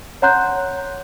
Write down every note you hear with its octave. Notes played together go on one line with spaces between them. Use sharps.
C#5 F#5 A#5 C6 F#6 G6